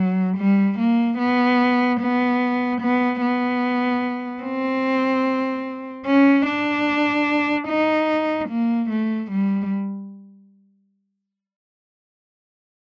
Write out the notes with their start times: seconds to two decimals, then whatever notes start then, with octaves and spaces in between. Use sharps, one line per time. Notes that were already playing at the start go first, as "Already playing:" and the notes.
Already playing: F#3
0.37 G3
0.78 A#3
1.18 B3
2.00 B3
2.81 B3
3.21 B3
4.43 C4
6.06 C#4
6.46 D4
7.68 D#4
8.49 A#3
8.89 A3
9.31 G3